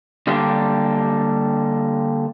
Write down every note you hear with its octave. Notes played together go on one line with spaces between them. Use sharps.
D3 G3 A#3 D4 G4